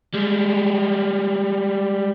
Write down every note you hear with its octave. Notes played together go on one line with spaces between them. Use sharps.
G3 G#3